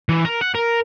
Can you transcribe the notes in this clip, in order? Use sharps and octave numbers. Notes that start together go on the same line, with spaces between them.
E3
A#4
F#5
A#4